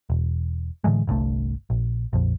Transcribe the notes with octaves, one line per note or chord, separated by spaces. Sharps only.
E1
A2 D3 E3 G#3
G1 C2 G2 A3
A#1
A#1 F2